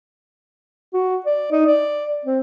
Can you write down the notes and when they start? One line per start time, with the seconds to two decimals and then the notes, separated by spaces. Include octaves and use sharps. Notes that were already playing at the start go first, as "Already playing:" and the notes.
0.93 F#4
1.26 D5
1.52 D#4
1.66 D5
2.25 C4